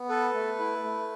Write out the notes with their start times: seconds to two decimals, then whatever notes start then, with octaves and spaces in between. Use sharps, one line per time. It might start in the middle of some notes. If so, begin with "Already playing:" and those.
Already playing: B3
0.09 A4 B4
0.34 A3
0.59 E4
0.84 A3